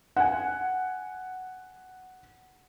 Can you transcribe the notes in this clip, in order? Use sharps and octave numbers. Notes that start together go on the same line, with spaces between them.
F#5 G#5